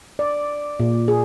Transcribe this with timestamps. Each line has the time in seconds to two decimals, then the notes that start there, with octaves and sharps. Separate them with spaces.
0.19 D5
0.80 A#2
1.08 G#4